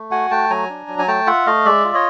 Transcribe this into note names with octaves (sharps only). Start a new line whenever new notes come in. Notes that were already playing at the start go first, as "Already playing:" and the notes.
Already playing: A3
F#4 F#5 G#5
A3 G5 A5
F#3 G#5 A#5
D4
F#3
G#5
A3 G5 A5
F4 E5 F#5
A3 D#5 F5
G#3 D5 E5
F4
C#5 D#5